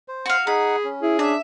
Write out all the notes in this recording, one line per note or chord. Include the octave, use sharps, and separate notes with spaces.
C5
F#4 F5
D#4 G#4 F#5 B5
C#4
E4 G#4
D4 E5